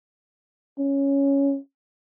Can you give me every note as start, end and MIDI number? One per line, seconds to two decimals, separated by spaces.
0.78 1.57 61